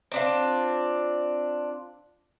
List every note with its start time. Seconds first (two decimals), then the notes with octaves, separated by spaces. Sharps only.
0.12 C4 D4 F4